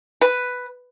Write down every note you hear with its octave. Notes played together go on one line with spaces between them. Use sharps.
B4